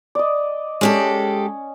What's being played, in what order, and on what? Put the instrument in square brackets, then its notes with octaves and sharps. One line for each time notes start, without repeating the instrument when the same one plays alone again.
[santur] D5 D#5
[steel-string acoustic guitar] G#3 G4 A4 [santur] C#4